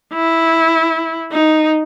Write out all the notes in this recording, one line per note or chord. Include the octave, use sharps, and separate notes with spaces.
E4
D#4